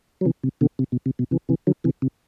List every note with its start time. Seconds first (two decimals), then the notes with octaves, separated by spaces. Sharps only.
0.21 F#3
0.25 C3 E3
0.44 C3
0.61 B2 D3
0.79 C3
0.92 B2
1.06 C3
1.19 B2
1.31 C3 E3
1.49 C3 E3
1.67 D3 F#3
1.84 C3 E3
2.02 C3